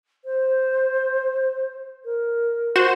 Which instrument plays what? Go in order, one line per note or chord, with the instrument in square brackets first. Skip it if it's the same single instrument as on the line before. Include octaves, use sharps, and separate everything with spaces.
[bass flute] C5
A#4
[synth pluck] F#4 C5 E7